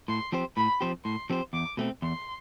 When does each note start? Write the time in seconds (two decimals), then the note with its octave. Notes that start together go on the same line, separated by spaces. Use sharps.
0.08 A2 C6
0.32 F3 C4 G4 C5
0.57 A2 B5
0.81 F3 C4 G4 C5
1.05 A2 C6
1.30 F3 C4 G4 C5
1.53 E2 D6
1.77 B2 A3 C4
2.02 E2 C6